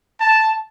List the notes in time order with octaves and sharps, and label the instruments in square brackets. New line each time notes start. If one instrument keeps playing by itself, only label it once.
[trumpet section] A5